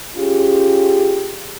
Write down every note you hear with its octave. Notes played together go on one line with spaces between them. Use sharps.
C#4 F4 G4 G#4